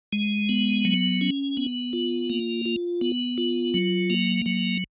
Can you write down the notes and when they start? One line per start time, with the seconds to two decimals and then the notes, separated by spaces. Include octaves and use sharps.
0.13 G#3
0.49 B3
0.85 F#3
1.21 C#4
1.57 B3
1.93 F4
2.30 A#3
2.65 F4
3.01 B3
3.38 F4
3.74 F#3
4.10 A#3
4.46 F#3